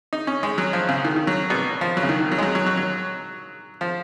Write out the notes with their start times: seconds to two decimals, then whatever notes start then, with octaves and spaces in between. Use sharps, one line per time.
0.13 D#4
0.27 C#4
0.43 G#3
0.58 F#3
0.73 F3
0.89 C#3
1.05 D#3
1.16 D#3
1.27 F#3
1.50 B2
1.81 F3
1.97 F#3
2.03 C#3
2.09 D#3
2.20 D#3
2.31 F#3
2.38 G#3
2.43 F#3
2.55 F#3
2.66 F#3
2.77 F#3
3.81 F3